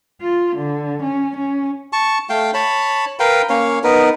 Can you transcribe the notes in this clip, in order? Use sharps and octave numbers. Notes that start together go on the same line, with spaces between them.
F4
D3
C#4
C#4
A5 C#6
A3 F5 G5
C#5 A5 B5
A#4 B4 F5 G5
A#3 C#4 C#5 F5
B3 D#4 A#4 B4